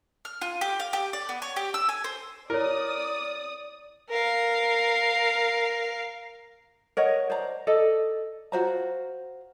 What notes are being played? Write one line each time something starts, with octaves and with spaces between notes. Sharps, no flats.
F6
F4
G4
F5
G4
D5
B3
C#5
G4
E6
G#5
C5
E4 A#4 C#5 D5 D#6
A#4 F5
A#4 C#5 D#5 F#5
C5 D5 A#5
A4 D5 D#5
F4 F#4 C5 A#5